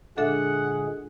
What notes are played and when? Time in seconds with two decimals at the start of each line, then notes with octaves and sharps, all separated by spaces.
0.18 A#2 D3 G#3 D4 G#4 A4 E5 F#5